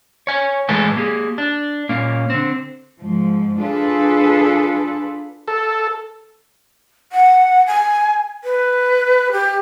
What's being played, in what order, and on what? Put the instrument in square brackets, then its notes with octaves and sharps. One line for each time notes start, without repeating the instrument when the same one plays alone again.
[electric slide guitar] C#5 G#5
A2 E3 G#3 A4 B4 G#5
A#3 G4 G#4
D4
A#2 A#3 C#4
D3 C4
[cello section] G#2 F3
D4 F4 G#4 A4 B4
[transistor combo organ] A4
[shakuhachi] F#5
G#5
B4
G4